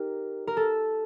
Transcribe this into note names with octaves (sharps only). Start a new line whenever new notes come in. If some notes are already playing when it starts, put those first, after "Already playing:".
Already playing: D#4 G4 A#4
A#4
A4